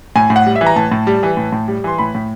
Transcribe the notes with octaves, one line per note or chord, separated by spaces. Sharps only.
A2 G#5
A2
F#5
G3
E5
E3
A#5
A2 A5
A2
G3
E3
A2
A2
G3
E3 C6
A2 B5
A2